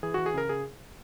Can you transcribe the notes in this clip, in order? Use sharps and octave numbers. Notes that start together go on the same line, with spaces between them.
E3 G#4
E3 F#4
G#4
C#3 A#4
C#3 G#4